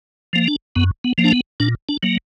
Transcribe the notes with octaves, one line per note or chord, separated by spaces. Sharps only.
F3 A#3
D4
F#2 B3
B3
F3 A#3
D4
B3
A#2 D4
D4
F#3 A#3